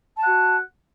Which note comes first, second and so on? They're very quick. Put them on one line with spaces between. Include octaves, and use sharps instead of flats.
A5 F#5 F#4